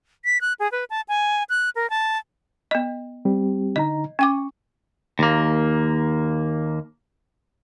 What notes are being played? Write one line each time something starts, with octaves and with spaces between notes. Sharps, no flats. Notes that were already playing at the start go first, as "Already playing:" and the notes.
B6
F#6
G#4
B4
A5
G#5
F#6
A#4
A5
B3 D#5
G3 C4 G4
D3 D#4 D#5 A#5
C#4 G5 C#6 D6
D#2 A#3